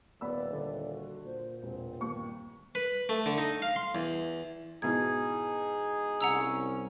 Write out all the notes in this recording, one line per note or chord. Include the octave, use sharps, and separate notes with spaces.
D#1 B3 D5 B5 E6
D3
F#4
A#2 C5
E1 C4
G1 D#2 C#6
B4
A3
D3
D#4
F5
C6
E2
G#2 B2 E3 D#4 G#4 G#6
C2 C#4 F#5 A#5 E6